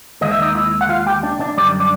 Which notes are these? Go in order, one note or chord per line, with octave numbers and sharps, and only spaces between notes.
D#2 D#3 G#3 D#5
E5
D#4 D#5
E4 E5
F#5
F4 F5
G4 G5
D4 D5
D4 D5
F#2 D3 G3 D4 D5
D4 D5